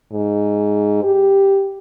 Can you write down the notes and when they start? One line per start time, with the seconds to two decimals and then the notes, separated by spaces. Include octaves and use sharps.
0.12 G#2
1.04 G4